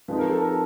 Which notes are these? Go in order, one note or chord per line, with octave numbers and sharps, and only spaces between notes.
F3 G#3 C4 D#4 B4
A#4
A4
A#4